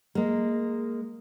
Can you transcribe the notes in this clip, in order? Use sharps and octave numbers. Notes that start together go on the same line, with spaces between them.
G#3 A#3